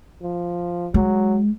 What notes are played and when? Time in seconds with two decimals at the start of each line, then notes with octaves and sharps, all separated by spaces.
0.22 F3
0.94 F#3 G#3